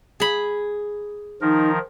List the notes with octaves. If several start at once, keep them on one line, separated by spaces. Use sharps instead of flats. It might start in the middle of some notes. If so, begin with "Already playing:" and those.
G#4 B5
D#3 F3 D#4 A#4